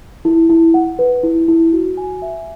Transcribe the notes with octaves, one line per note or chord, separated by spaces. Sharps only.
E4
E4
F#5
B4
E4
E4
F#4
G#5
E5